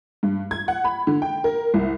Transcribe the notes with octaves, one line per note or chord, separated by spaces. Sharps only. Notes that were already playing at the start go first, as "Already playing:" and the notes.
G2
G#6
F#5
B5
D3
G5
A#4
C2